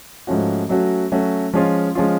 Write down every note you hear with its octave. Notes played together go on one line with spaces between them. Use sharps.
G#2 F3 A3 C#4 F#4
F#3 A3 C#4 F#4
F#3 A3 C#4 F#4
F3 G#3 C#4 F4
F3 G#3 C#4 F4